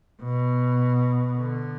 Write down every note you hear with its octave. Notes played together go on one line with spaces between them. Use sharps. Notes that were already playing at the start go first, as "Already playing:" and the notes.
B2
D3